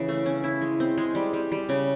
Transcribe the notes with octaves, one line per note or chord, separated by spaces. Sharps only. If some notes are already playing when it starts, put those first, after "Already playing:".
Already playing: C#3 E3
A3
C#4
E4
G#3
C4
G#3
G3
G3
G3
C#3